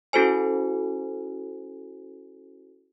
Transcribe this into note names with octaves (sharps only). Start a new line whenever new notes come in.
C#4 E4 F#4 A4 C5 G#5